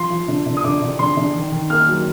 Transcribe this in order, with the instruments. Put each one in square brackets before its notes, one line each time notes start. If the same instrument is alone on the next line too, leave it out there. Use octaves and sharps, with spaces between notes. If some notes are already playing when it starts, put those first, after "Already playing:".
Already playing: [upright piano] F3 C6
F3
D3
D3
D#6
D3 D6
D3
D3 C6
D3
D#3
D#3
A#3 F6
F#3